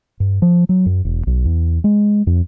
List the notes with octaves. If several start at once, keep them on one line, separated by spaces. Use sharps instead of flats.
G2
F3
F#3
F#2
E1
B1
E2
G#3
F2